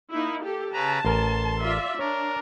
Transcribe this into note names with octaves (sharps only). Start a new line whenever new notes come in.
A#3 D#4 E4
G4 A4
C#3 B4 A5 A#5
A1 A#4 C6
F4 D5 E5
D4 A#4 C#5